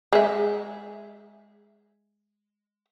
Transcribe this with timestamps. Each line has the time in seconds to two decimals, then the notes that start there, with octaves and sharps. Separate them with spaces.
0.13 G#3 E5